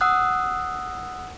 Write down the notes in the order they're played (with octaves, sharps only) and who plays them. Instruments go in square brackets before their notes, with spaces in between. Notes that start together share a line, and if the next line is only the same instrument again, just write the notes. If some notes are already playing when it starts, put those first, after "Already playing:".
[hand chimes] F#5 D#6 E6 F#6